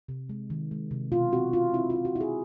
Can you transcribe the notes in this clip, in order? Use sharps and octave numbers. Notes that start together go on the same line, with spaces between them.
C3
G#3
D#3
G#3
C3
B2 F4
C4 F#4
E4 F4
C4 E4
F4
E4
F#4
E4
G#4